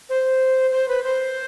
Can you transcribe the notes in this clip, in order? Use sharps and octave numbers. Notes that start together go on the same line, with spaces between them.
C5
C5
B4
C5